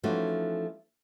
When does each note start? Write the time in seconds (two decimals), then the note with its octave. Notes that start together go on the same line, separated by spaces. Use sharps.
0.03 E3 F3 A3 C#4 D#4 F#4